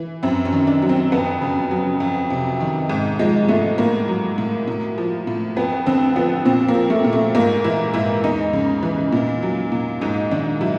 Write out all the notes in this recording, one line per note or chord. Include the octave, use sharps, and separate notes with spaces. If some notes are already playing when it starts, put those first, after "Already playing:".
Already playing: E3
F#2 C4
C#4
D#3
D4
F#3
C4
F2 B3
C#3
F#3
F2
C3
D#3
G#2
F3 G#3
G#2 A3
A2 A#3
F#3
A2
A2
F3
A2
F2 B3
D3 C4
F3 B3
A#2 C4
A#3
F3
A3
A#2
A3
G#2 A#3
E3 E4
G#2 E4
E2 D#4
C#3
E3
A#2
F#3
A#2
G#2 D#4
D#3 D4
F#3 E4